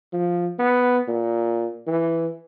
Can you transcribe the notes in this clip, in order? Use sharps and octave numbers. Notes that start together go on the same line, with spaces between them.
F3
B3
A#2
E3